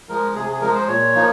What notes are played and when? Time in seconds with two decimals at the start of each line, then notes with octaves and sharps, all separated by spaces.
0.09 F3 G#3 A#4
0.35 C3 G#4
0.49 G#4
0.61 F3 G#3 A#4
0.75 C5
0.88 A#2 C#5
1.15 F3 A#3 D#4